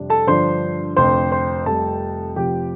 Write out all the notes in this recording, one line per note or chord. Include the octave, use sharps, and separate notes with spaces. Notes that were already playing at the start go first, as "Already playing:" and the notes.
Already playing: F2 C3 G3 D4
A4 A5
G2 D3 F3 D4 C5 C6
F1 F2 D3 C5 C6
C5 C6
F1 F2 C3 G3 A4 A5
F1 F2 F3 C4 G4 G5